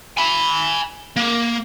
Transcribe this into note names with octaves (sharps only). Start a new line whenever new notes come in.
G#5 B5
A#3